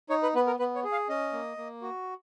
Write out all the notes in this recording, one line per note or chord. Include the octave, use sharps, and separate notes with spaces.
D#4 C#5
B4
B3 B4
A#4
B3 B4
C#5
G#4
F5
C#4 D#5
A#3
A#3
F#4